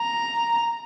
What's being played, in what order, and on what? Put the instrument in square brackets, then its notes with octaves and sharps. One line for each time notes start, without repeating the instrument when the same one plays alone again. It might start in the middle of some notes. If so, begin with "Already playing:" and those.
Already playing: [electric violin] A#5